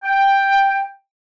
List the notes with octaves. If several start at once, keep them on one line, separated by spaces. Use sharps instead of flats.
G5